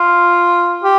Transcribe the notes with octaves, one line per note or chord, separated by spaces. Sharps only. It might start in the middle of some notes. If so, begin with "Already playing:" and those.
Already playing: F4
G4